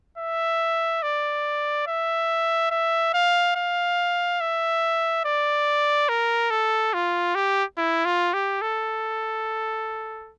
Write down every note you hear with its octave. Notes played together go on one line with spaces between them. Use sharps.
E5
D5
E5
E5
F5
F5
E5
D5
A#4
A4
F4
G4
E4
F4
G4
A4